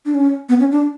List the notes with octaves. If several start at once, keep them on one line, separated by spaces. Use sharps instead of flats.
D4
C#4
B3
C#4
D4